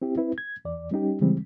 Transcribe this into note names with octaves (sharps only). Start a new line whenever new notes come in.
C4 E4 G4
C4 E4 B4
G#6
E2 D5
G3 C#4 D#4 G4
C#3 E3 G3 G#3 C4